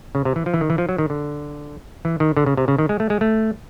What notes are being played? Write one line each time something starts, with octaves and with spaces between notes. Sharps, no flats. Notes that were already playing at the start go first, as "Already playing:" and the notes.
C#3
C3
E3
F3
E3
D#3
E3
F3
F#3
D#3
D3
E3
D#3
D3
C#3
C3
C#3
D#3
G#3
A3
G#3
A3